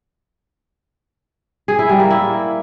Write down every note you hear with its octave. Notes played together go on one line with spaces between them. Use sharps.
G#4
E4
G3
A#3
E4